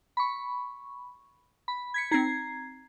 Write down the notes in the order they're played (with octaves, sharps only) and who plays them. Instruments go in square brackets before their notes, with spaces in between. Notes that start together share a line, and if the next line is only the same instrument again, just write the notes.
[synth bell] B5 C#6
B5
G#6 B6 C#7
[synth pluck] C4 D#4 [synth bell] A#5 G#6 C7